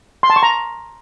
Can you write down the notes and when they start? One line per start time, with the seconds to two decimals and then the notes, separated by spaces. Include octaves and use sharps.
0.23 C6
0.30 A5
0.36 C#6
0.43 A#5